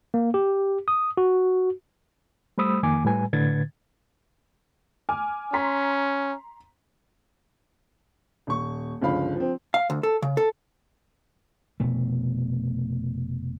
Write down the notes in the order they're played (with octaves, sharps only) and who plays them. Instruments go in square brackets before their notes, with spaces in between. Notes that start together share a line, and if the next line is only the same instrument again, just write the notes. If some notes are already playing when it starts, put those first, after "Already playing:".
[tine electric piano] A#3
G4
D#6
F#4
[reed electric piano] G3 A3 C5 B5 D#6 E6
F2 D#3 A#3 G#5 D6
A2 G3 B4 G#5
A2 D3 B4 G#6 A6
[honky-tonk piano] G#5 D6 F6
[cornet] C#4 [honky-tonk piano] A#5 C6 B6
[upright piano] D#1 C#6
G1 C#2 F3 F5 B5
F3 C4
[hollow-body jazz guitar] F5
D2
A4
C#3
A4
[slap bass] F1 B2 A3